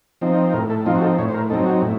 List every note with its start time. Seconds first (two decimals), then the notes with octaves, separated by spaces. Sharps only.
0.21 F3 C4 D#4
0.54 A2 A#4
0.70 A4
0.86 F3 C4 D#4 F4
0.95 F#4
1.02 A4
1.18 A2 C#5
1.28 C5
1.34 A#4
1.50 F#3 C4 D#4 A4
1.66 F#4
1.82 A2